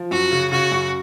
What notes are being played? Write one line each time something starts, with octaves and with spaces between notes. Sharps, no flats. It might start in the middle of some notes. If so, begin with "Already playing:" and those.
Already playing: F3
F#2 F#4
C#3
C#3 F#4
F#2